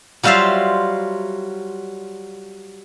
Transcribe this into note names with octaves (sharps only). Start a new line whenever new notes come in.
F#3 G3 F4 C5 E5 F5